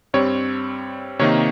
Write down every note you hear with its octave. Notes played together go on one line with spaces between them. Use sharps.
G2 G3 C4 C#5
C3 D#3 A#3 D#4 C#5